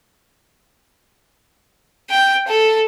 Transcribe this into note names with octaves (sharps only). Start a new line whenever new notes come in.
G5
A4